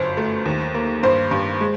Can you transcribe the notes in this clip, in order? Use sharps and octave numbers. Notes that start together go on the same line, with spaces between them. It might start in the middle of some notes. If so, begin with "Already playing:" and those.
Already playing: G1 F#2 C5
A3
D#2
A#3
G2 C5
G2
G#3